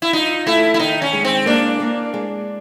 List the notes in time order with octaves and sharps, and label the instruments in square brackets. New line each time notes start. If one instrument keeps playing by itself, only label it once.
[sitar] E4
[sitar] D#4 [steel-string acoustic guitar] F4
[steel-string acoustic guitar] A3 [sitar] E4
[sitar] E4
[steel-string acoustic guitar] D#3 [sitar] D#4
[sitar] C#4
[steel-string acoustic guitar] G#3
[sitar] C4
[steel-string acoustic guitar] A#3 [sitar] D4
[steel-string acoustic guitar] A#3
G#3